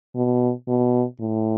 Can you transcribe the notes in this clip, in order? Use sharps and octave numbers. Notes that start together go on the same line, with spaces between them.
B2
B2
A2